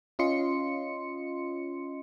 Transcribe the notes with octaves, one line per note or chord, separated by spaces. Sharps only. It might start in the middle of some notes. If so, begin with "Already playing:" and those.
C#4 F4 D#5 C6 C#7